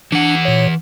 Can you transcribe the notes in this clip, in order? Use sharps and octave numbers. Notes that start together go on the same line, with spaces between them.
E3 D4 F#5
A#2 C#5